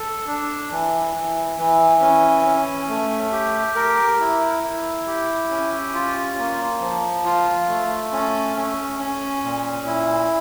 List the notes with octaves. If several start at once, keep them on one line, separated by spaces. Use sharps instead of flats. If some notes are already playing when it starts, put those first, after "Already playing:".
Already playing: A4
D4
E3
E3
E3
C#4
C#4
A3
G4
A#4
E4
E4
G4
C#4
F4
A#3
F3
F4
A3
C#4
C#4
C#4
A#2
E4